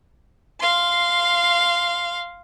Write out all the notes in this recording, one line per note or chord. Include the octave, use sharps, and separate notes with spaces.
F5 C6